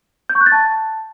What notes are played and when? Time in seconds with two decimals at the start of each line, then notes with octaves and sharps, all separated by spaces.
0.29 G6
0.35 C#6
0.41 F#6
0.46 A6
0.52 A5